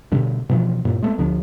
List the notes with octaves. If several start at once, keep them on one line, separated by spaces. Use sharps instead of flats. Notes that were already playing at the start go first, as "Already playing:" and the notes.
B2 D3 G3
B2 D3 E3 F3
G2 A#2
G#3 A3 B3
D2 D3 F3